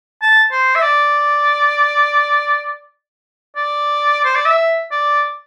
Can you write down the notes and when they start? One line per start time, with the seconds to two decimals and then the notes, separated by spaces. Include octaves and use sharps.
0.22 A5
0.52 C5
0.76 E5
0.83 D5
3.56 D5
4.25 C5
4.35 D5
4.46 E5
4.91 D5